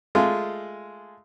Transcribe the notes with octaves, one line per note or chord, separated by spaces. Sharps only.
G#3 A3 F4